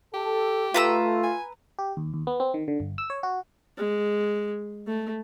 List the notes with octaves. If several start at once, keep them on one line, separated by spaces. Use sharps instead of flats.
G4 A4
A3 F4 B4 A#5 E6
G#5
G4
D#2
D#2
B3
C4
D#3
D3
G1
E6
C#5
F#4
G#3
A3